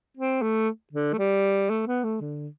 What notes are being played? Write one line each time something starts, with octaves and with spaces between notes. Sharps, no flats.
C4
A3
D3
A3
G3
A3
B3
A3
D3